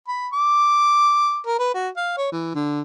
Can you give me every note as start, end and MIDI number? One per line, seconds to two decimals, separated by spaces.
0.09 0.28 83
0.33 1.40 86
1.47 1.59 70
1.60 1.73 71
1.75 1.89 66
1.97 2.15 77
2.18 2.28 73
2.32 2.54 52
2.55 2.81 50